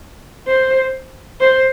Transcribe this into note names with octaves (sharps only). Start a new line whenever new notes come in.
C5
C5